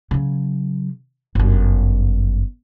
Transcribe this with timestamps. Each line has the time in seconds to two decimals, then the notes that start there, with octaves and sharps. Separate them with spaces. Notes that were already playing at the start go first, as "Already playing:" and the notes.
0.11 C#3 F#3
1.35 G1 F#2